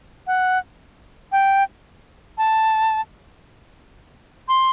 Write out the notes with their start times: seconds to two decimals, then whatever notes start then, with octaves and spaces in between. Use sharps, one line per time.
0.27 F#5
1.32 G5
2.38 A5
4.48 C6